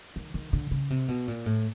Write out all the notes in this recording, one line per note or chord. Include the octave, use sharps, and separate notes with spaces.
D#3
D#3
D3
C#3
C3
B2
A#2
A2